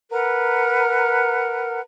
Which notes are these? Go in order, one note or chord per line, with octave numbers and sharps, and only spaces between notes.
A#4 B4 F#5 A#5